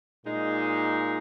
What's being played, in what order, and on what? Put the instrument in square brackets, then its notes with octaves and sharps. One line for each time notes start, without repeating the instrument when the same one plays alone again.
[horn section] A#2 G#3 D#4